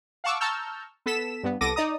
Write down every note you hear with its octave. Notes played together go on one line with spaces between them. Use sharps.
F5 F#5 A5 C#6 D6 E6
A5 A#5 C#6 E6 F6 G6
B3 A4 B6 E7
G2 B3
C2 B3 A4 D6 A#6 D#7
D#4 D5 A#5 D#6